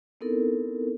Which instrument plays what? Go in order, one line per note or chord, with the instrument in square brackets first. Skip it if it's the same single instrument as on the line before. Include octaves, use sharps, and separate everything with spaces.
[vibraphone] B3 C4 D#4 E4 A4 A#4